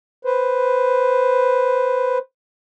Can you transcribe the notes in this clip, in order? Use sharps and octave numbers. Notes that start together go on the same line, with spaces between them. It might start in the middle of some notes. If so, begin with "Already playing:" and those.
B4 C5